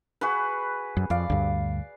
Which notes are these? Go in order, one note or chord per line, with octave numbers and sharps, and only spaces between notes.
F#4 G#4 B4
F#2
F2 D5 F5
D2 G2